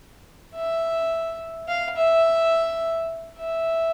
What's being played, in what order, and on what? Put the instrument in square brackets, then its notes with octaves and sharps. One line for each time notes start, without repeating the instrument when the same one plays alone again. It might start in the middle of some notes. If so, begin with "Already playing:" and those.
[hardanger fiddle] E5
F5
E5
E5